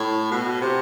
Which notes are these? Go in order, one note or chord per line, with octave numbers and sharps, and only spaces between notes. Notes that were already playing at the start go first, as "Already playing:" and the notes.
Already playing: A2
B2
C3